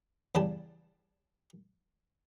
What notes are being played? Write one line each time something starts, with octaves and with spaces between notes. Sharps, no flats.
E2 C#3 G3 A5